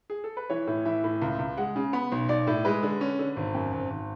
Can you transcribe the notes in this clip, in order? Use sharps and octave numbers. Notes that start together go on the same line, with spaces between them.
G#4
A4
B4
E3 C#5
A2
E3 E5
A2
C#2
C#2
G#3 F#5
C#3
B3 B5
B1
B1 D5
A2
G#3 B4
D3
C#4
D3
G#1
F#2
G#1
G#1